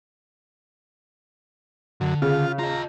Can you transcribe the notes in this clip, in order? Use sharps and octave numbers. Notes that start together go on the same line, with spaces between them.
F#2 D3
C#3 F4
F4 D#5 A#5